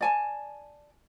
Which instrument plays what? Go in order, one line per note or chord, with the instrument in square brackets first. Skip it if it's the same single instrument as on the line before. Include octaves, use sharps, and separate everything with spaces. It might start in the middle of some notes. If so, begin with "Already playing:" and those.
[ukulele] D5 G#5 A5